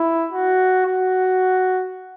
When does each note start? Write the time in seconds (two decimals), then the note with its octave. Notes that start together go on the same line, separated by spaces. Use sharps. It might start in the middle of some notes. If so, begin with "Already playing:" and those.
Already playing: E4
0.32 F#4
0.86 F#4